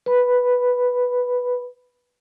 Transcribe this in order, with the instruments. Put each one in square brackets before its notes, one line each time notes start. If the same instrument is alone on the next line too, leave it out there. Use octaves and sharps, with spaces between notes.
[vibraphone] B4 B5